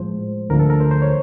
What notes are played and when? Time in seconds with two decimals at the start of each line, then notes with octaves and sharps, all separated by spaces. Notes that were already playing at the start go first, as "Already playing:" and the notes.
Already playing: A2 F3 G#3 C5
0.49 D2 D3 F3 A3 A#4
0.60 A4
0.70 A#4
0.80 C5
0.91 C5
1.02 C#5